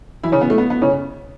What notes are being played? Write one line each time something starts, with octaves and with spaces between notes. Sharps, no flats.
E3 E4
C#3 C#4
B3
A3
B3
B3
C#3 C#4